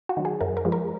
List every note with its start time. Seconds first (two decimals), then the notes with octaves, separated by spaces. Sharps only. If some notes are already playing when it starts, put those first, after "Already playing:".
0.09 F#4
0.17 D#3 F#3
0.25 G#4
0.41 F#2 A#4
0.57 A#4
0.65 F3 G#3
0.72 A#4